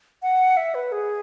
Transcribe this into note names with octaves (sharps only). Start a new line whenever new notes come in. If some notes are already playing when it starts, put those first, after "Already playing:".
F#5
E5
B4
G#4